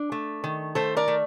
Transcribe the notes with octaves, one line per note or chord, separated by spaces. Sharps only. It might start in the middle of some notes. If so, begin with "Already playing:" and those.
Already playing: D4
A3
D#3
A3 A4 C5
A#4 D5
A3